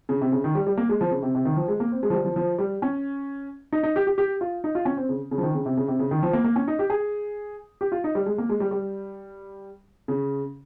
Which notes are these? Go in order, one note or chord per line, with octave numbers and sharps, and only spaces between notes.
C#3
C3
C#3
D#3
G3
G3
A#3
G#3
F3
C#3
C3
C3
D#3
F3
G#3
A#3
C4
G#3
F3
G3
F3
F3
G3
C#4
D#4
D#4
G4
G4
G4
F4
D#4
F4
C#4
C4
C#3
C#3
F3
D#3
C#3
C3
C#3
C3
C#3
D#3
F3
A#3
A#3
C#4
D#4
G4
G#4
G4
F4
D#4
G3
G#3
A#3
G#3
G3
G3
C#3